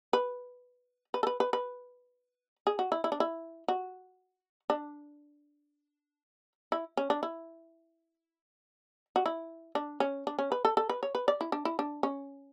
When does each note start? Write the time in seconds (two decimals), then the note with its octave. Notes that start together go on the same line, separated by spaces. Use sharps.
0.13 B4
1.14 B4
1.23 A4
1.27 B4
1.40 B4
1.53 B4
2.67 G#4
2.79 F#4
2.92 E4
3.04 E4
3.12 D4
3.20 E4
3.68 F#4
4.70 D4
6.72 E4
6.97 C#4
7.10 D4
7.23 E4
9.16 F#4
9.26 E4
9.75 D4
10.00 C#4
10.27 D4
10.39 C#4
10.52 B4
10.65 A4
10.77 A4
10.89 B4
11.03 C#5
11.15 B4
11.28 D5
11.41 E4
11.52 D4
11.65 E4
11.79 D4
12.03 C#4